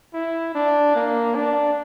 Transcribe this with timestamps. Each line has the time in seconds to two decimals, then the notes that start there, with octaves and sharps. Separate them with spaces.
0.14 E4
0.55 D4
0.95 A#3
1.35 D4